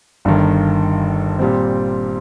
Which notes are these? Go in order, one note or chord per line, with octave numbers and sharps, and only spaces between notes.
G1 G2 D#3
A#2 G3 C4